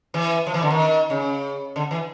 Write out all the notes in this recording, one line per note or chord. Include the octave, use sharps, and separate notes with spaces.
E3
F3
E3
D3
D#3
C#3
D3
E3